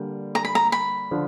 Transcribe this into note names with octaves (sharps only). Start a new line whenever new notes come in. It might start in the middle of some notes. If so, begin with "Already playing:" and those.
Already playing: D3 G3 A#3
A#5
B5
A#5
B5
D3 F3